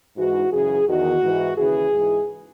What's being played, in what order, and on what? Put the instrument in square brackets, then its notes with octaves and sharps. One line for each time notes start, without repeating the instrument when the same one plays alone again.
[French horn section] G#2 E3 F#4
F#2 C#3 E3 G#4
E2 D#3 F#4
G#2 E3
D#2 C#3 E3 G#4
G#2 E3